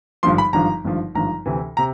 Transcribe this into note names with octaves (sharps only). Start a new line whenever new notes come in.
G#1 G2 D3 F3 C6
B5
G#1 G2 D3 F3 A#5
G#1 G2 D3 F3
G#1 G2 D3 F3 A#5
D2 C3 E3
C3 A#5